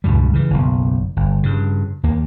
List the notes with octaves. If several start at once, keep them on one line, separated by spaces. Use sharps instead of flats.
C#2 G2 B2 G3
C#3 E3
F#1 B1
G1
G2 C#3
D#2 A#3